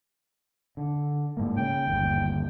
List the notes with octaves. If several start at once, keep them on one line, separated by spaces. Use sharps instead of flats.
D3
G#2 A#3
C#3 G5
G1 D#2